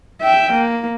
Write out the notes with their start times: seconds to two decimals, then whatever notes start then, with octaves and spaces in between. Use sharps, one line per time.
0.21 E5 G5
0.52 A#3